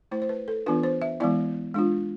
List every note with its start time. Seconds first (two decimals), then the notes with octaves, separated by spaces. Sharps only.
0.11 A3 E4 C5
0.22 C5
0.29 B4
0.48 A4
0.66 E3 B3 D4 F4 B4
0.83 C5
1.02 E5
1.20 E3 G#3 B3 E4 D5
1.74 G#3 D4 F4